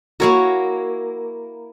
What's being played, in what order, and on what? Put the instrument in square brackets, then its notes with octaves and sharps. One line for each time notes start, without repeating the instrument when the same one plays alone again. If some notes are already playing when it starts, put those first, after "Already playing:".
[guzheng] A#3 E4 A#4 [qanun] F#4 C#5 C#6